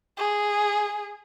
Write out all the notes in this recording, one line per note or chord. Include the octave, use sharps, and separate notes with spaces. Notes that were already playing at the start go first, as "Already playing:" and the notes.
G#4